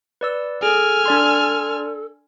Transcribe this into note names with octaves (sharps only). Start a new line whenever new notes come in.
B4 D5 E6
G#4 A4 G#5 F6
D4 D5 C6